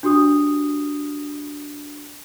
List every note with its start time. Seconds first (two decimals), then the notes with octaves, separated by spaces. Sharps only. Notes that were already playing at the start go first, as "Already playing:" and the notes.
0.03 D4 F#4 G4 D#6